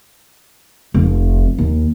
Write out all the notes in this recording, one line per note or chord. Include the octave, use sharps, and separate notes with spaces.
F1
D#2